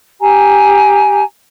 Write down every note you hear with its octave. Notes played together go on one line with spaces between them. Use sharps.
G4 G#5 A#5